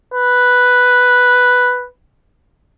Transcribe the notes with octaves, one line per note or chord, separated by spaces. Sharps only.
B4